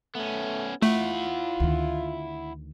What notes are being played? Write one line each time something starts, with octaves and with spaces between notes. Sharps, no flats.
A3 B3 C#4
A3 E4 F4 F#5
D2 D#3